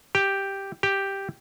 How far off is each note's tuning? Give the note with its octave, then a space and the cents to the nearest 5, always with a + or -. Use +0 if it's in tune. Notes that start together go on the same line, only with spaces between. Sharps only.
G4 +0
G4 +0